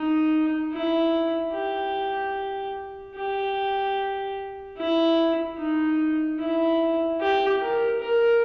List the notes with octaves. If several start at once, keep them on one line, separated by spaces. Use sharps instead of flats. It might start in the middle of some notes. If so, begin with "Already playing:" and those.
Already playing: D#4
E4
G4
G4
E4
D#4
E4
G4
A#4
A#4